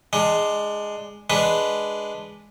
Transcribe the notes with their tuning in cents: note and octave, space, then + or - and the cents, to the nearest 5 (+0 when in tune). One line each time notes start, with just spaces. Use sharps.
G#3 +0 D4 +20
G#3 +0 D4 +0 B4 +0